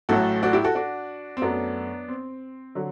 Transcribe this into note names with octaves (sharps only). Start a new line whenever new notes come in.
A1 A2 F#3 A3 F#4 A4
D4 F#4
E4 G4
F#4 A4
D4 F#4
C4
F#2 F#3 A3 B3 D4
C4
D3 F#3